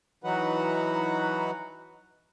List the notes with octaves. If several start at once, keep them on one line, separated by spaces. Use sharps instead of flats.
E3 F#3 D#4 F#4 B4 F#5